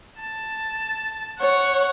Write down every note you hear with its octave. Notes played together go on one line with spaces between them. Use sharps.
A5
C#5 F#5